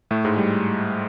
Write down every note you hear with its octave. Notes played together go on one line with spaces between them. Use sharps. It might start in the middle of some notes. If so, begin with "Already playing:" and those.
A2 A3
G#2 G#3
G3